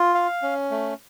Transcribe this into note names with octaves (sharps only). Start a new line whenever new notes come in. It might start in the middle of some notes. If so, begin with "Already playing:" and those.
Already playing: F4
F5
C#4
A3